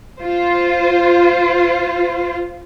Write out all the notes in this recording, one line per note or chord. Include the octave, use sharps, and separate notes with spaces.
F4 C5